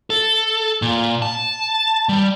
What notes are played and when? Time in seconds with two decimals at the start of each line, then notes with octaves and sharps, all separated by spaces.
0.10 A4
0.82 A#2
1.22 A5
2.09 G3